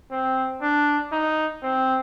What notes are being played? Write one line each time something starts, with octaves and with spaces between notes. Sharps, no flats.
C4
D4
D#4
C4